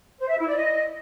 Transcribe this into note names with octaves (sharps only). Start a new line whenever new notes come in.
C5
E5
E4
D5
D#5